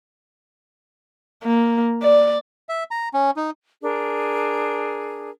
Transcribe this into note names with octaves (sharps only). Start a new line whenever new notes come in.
A#3
D5
E5
A#5
C#4
D#4
D4 G#4 A#4